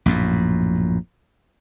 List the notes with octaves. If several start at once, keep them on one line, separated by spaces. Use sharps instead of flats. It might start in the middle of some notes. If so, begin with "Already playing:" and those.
A#1 F#2 A2